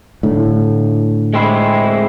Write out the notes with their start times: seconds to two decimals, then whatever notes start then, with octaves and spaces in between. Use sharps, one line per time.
0.23 A2 D3
1.34 G#3 C4 E4